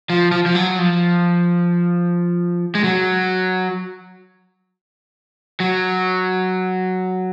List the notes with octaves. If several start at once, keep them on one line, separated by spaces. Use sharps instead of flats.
F3
F3
F3
F#3
F3
G#3
F#3
F#3